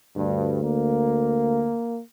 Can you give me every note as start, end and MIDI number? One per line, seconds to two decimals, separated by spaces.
0.17 1.73 38
0.17 0.62 43
0.63 2.00 58